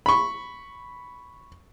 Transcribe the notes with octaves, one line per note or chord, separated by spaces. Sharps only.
B5 C#6